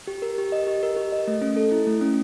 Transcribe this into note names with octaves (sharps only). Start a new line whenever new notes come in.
G4
A#4
G4
D#5
G4
A#4
G4
D#5
A3
C#4
A4
E4
A3
C#4